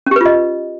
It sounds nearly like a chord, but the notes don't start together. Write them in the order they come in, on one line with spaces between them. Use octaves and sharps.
C#4 G4 B4 F4 D#5